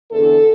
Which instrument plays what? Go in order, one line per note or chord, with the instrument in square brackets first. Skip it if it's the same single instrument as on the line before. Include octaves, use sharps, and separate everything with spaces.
[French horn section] E2 D3 A4